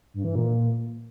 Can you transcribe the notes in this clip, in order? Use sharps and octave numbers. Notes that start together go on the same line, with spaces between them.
G2
E3
A#2